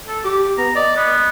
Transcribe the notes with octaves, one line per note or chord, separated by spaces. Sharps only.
A4
G4 D6
B3 A#5
D5 D#5
B3